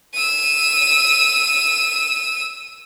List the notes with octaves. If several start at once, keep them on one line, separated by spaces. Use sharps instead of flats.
E6 D#7